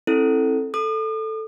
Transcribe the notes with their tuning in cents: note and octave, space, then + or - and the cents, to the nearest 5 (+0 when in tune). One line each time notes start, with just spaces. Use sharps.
C4 +30 E4 -10 A4 +0
A4 +0 D#6 -45